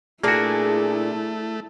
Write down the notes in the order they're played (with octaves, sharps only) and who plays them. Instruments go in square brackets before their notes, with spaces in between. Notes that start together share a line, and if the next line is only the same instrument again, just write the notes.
[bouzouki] A#2 D4 G#4 [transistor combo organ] A3 [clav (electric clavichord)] A#3 F#4 [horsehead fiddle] E4